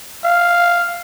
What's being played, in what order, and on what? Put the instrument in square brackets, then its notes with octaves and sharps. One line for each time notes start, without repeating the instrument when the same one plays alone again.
[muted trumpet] F5